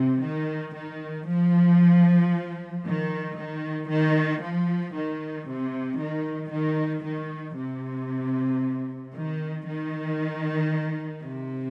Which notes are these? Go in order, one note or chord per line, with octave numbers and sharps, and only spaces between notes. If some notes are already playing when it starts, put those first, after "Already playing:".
Already playing: C3
D#3
D#3
F3
D#3
D#3
D#3
F3
D#3
C3
D#3
D#3
D#3
C3
D#3
D#3
C3